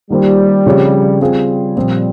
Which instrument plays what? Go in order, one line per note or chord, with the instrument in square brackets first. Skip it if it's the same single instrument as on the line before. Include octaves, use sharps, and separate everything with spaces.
[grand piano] D#3 A#3 F4 C5 [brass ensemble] G3
[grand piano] C#3 F3 C4 G4 C#5
[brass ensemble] G3 [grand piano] C4 F4 G#4
[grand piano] A#2 F3 C4 F4